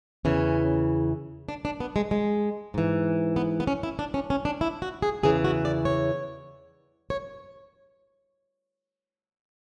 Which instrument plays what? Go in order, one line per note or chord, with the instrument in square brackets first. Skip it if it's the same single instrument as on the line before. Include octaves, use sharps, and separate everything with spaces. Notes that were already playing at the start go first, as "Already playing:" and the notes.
[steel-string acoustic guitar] E2 C#3 E3 C#4
D4
D4
B3
G#3
G#3
G#2 E3
B3
B3
C#4
E4
D4
C#4
C#4
D4
E4
F#4
G#4
E2 C#3 E3 G#4
F#4
D5
C#5
C#5